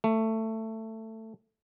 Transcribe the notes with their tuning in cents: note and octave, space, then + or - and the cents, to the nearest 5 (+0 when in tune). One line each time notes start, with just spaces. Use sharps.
A3 +15